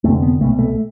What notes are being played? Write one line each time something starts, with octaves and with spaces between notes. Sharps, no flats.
F1 F2 D3 A3
B3
C2 B2 A3
A3